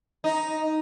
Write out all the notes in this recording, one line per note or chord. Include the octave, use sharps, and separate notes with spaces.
D#4